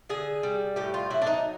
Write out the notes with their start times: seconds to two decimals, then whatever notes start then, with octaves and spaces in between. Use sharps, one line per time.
0.10 D3 G#4
0.43 G3
0.76 A2 G4
0.94 F4
1.10 F#3 E4
1.22 D4
1.27 D#4